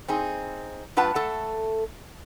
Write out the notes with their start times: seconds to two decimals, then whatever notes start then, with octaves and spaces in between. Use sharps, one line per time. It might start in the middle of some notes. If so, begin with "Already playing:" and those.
0.08 C4 D#4 G#4
0.97 G2 F4 B4 F#5 A5
1.15 A3 A4